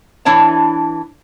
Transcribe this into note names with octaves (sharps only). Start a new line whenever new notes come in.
E3 D4 E4 C#5 A5